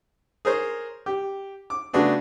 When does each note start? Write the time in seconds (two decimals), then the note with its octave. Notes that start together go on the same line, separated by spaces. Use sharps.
0.45 G#4 A#4 C5 C#5
1.06 G4
1.70 D6
1.93 C#3 A3 B3 D4 F#4 G#4